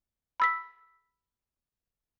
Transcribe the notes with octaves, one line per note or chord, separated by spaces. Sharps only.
B5 E6 B6